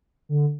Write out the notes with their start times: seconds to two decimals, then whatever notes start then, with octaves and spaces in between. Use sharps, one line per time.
0.29 D3